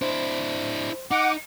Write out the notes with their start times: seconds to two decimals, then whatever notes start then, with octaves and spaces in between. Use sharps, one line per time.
0.02 D4 E4 C5
1.11 D#4 F#5 D6